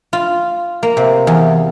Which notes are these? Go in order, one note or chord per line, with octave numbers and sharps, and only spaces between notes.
F4
A#3
C3
E2